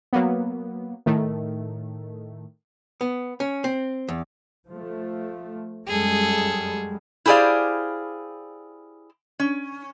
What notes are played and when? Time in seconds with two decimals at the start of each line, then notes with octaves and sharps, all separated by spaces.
0.13 F#3 A#3 B3
1.06 A2 D#3 A3
3.01 B3
3.40 C#4
3.64 C4
4.08 E2
4.68 F3 A3
5.88 F#2 G3 G#3 G#4 A4
7.26 E4 G4 G#4 C5 D5 F5
9.40 C#4